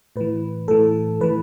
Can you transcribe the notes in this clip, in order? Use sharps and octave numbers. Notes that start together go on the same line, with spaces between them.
A2 E3 B4
A2 E3 A4
A2 E3 B4